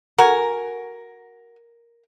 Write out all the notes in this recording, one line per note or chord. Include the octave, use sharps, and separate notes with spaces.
F#4 A#4 G#5